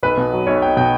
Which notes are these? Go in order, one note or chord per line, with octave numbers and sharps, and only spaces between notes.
B1 B4
B2
F#3
B1 C#5
B1 G5
B2 G5